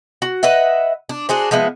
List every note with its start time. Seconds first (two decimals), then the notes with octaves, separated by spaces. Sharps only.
0.22 F#4
0.43 B4 D#5 E5 F#5
1.09 D4
1.29 D4 F#4 G#4 C5
1.51 F3 G#3 B3 E4